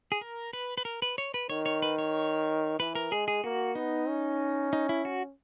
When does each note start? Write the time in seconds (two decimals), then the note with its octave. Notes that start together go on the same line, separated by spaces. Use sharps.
0.12 G#4
0.21 A#4
0.53 B4
0.78 B4
0.85 A#4
1.02 B4
1.18 C#5
1.34 B4
1.50 D#3 C#5
1.66 C#5
1.82 B4
1.98 C#5
2.79 E3 B4
2.95 A#4
3.12 G#3 G#4
3.28 G#4
3.44 A#3 F#4
3.75 B3 D#4
4.08 C#4
4.73 D#4
4.89 E4
5.05 F#4